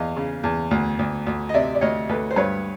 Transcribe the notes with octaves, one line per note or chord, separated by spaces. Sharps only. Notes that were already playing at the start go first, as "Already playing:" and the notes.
Already playing: E2 D#5 F5
C#3
E2
D2
D2
D2
D#5
C3 D5 E5
D5
D2 C#5 D#5
D2 A4 B4
C5
G2 B4 C#5